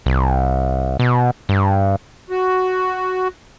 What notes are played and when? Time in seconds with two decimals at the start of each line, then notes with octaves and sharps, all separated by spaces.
0.06 C2
0.99 B2
1.49 G2
2.30 F#4